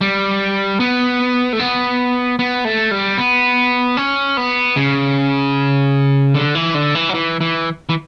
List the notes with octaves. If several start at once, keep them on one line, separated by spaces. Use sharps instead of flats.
G3
B3
A3
B3
B3
A3
G3
B3
C#4
B3
C#3
D3
E3
D3
E3
F#3
E3
E3
E3